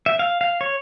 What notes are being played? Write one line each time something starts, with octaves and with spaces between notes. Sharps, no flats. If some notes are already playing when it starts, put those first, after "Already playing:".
E5
F5
F5
C#5